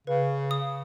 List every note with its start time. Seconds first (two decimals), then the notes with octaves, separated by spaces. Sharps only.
0.07 C#3 B4
0.51 D#6